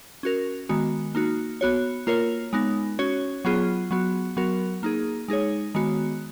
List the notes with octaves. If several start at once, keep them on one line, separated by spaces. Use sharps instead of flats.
C#4 F#4 A#4
D#3 G#3 B3 F#4
A#3 D#4 F#4
B3 F#4 C#5
A#3 F4 A#4 C#5
G#3 B3 D#4
C#4 F#4 C#5
F#3 B3 F4 G#4
F#3 B3 F#4
F#3 B3 F#4 A#4
A#3 D#4 G#4
G#3 D#4 G#4 C#5
D#3 G#3 B3 F#4